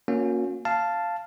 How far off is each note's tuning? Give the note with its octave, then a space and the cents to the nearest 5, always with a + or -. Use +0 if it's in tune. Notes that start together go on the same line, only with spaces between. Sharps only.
A#3 +5 C#4 +0 F#4 -40
F5 -10 A5 +0